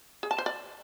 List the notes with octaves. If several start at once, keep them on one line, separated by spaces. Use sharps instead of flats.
G#4
A5
C5
D5